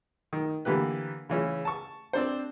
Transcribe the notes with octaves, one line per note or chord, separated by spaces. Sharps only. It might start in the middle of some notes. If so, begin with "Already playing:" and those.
D#3
D3 E3 A#3 G4 B4
C#3 E3 C#4
A5 C#6
C4 D4 C5